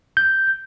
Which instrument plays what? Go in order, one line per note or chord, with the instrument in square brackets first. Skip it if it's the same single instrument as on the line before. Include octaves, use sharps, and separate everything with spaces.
[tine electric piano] G6